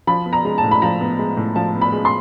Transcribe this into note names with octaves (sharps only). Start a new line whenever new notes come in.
F3 B5
B3
A#5
G#3
A5
A2
B5
F3 A#5
B3
G#3
A2
F3 A5
B3
B5
G#3
C6